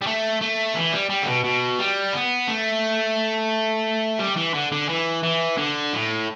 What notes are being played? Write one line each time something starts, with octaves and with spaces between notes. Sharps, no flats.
G3
A3
A3
E3
G3
G3
D3
B2
B2
G3
B3
A3
G3
E3
D3
D3
E3
E3
D3
A2